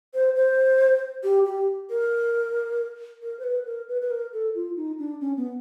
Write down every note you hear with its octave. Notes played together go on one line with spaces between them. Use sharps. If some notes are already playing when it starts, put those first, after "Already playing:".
C5
C5
G4
G4
A#4
A#4
C5
B4
A#4
B4
B4
A#4
A4
F4
D#4
D4
C#4
B3